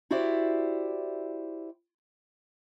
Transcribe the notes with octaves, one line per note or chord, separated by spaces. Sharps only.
E4 F#4 G4 C5 D5 E5